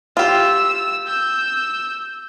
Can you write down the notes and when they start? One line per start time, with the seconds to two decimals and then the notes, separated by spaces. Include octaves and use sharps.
0.17 F4 G4 E6
1.08 E6 G6